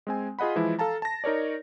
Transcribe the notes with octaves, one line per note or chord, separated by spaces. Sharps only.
G#3 C4 G#5
F4 G#4 D#5 F#5 B5
E3 F3 G#3 E4
A4 F5 A5 A#5
A5 A#6
D#4 A#4 C#5 D5